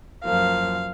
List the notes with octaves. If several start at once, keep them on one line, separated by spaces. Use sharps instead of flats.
F#2 F3 A#3 F5